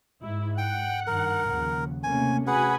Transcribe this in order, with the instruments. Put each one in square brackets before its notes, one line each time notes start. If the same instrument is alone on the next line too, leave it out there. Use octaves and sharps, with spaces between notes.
[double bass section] G#2 [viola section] E4
[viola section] F#5 [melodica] G5
[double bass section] G2 D#3 [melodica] A#4
[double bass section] D#2 C#3 F3
[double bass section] C3 A3 C#4 [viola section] A#3 [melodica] G#5
[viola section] F#4 G#5 B5 [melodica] G#4 B4 F#5